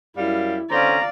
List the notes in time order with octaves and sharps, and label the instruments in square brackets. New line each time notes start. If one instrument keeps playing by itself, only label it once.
[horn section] F#2 G3 F5 [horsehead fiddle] E4
[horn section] D3 C4 C#4 [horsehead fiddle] D5 F5 [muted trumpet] A#5